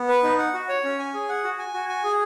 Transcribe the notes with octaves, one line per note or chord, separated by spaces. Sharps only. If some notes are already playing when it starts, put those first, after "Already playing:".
Already playing: B3
B4
D#4
F#5
F#4
C#5
C#4
G#5
G#4
F#5
F#4
G#5
F#4
G#5
G#4